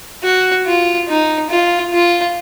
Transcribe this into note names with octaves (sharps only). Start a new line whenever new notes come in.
F#4
F4
D#4
F4
F4